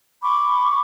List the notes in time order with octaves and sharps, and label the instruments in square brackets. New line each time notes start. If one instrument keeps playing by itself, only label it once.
[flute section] B5 C#6 D6